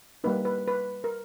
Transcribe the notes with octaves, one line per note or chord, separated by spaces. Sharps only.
G3 A#3 D#4 B4
B4
B4
A#4